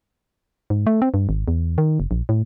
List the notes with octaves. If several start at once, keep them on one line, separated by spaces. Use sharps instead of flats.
G#2
A3
C4
G2
G#1
E2
D#3
F#1
A#1
A2